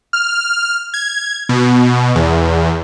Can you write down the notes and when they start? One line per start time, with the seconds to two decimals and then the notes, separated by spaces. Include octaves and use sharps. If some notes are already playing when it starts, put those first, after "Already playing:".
0.13 F6
0.94 G#6
1.49 B2
2.15 E2